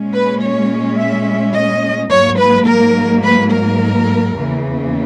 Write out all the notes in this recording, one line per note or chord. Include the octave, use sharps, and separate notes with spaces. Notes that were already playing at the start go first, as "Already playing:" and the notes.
Already playing: A#2 G#3 C#4
B4
C#5
E5
D#5
G#2 F#3 A#3 C#5
B4
A#4
B4
A#4
E2 C#3 E3 A#3